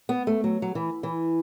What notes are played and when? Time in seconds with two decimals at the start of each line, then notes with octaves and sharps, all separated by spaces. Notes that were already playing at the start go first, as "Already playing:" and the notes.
0.09 B3
0.27 A3
0.44 F#3
0.62 F#3
0.75 E3
1.03 E3